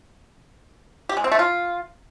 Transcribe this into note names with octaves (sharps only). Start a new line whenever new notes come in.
G4
G#3
C4
A3
F4